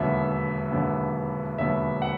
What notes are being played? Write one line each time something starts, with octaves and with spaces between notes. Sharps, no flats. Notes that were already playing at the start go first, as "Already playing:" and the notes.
Already playing: E1 D#2 D3 F#3 B3 E5
E1 D#2 D3 F#3 B3
E1 D#2 D3 F#3 B3 E5
F#5